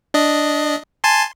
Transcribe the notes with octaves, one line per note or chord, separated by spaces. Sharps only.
D4 D#5
G#5 A5 C6